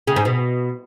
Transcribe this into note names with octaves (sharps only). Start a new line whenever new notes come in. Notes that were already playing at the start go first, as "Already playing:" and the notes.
C#3
G#2
B2